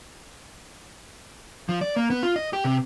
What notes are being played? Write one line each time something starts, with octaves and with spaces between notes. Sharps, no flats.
F3
D5
A#3
B3
F4
D#5
G4
C3